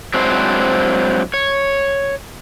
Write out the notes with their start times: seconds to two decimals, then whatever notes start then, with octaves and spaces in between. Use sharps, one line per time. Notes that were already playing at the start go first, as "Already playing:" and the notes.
0.14 F#3 G#3 C4 D4 E4 C5
1.34 C#5